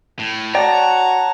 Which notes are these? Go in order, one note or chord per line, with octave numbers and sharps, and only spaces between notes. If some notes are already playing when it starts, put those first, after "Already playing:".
A2
F#4 C#5 D5 G5 A5 A#5 A6